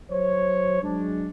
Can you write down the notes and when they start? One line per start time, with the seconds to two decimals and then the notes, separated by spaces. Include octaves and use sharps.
0.11 F#3 C5 C#5
0.82 F#3 G#3 D4